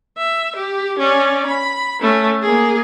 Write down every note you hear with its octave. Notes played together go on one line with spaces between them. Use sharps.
E5
G4
C#4 D5
B5
A3 C#4
A#3 G#4